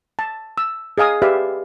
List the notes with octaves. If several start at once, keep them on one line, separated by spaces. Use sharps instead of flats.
A5
E6
G#4 D#5 F5 G#5 D#6
G4 B4 D5 E5 F5